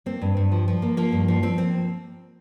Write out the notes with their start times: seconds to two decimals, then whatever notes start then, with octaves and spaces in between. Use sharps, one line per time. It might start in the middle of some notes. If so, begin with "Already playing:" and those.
0.06 A#3 C4
0.21 G2
0.37 G2
0.52 F3
0.68 F3
0.82 A#3
0.97 F3 A#3
1.12 G2
1.28 F3
1.43 F3 C4
1.58 A#3 C4